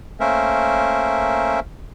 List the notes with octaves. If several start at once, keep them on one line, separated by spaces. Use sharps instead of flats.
A3 A#3 C#4 A#4 C5 E5